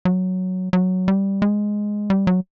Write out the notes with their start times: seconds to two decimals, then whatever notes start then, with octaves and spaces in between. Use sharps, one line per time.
0.05 F#3
0.73 F#3
1.08 G3
1.42 G#3
2.10 G3
2.27 F#3